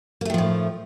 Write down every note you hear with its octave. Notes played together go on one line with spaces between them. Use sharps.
A2 D#3 F3 A3 A#3